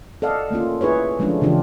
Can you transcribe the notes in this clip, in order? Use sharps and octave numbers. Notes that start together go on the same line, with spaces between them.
A4 D5 D#5 F5 F#5
A3 A#3 C#4 F4
E4 G#4 B4 C#5
F3 G#3 A3 C#4 D4 F4
C#3 E3 D4 F4 G4